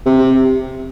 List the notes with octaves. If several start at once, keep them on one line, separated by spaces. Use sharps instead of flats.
C3